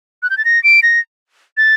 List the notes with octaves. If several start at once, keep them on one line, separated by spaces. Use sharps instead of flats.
F#6
G6
A6
A#6
D7
A#6
A6